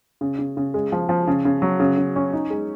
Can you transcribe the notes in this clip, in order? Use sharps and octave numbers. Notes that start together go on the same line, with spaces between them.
C#3
C#3
C#3
G#3
F3
F3
C#3
C#3
F#3
C#3
C#3
C#4
D#4
G#3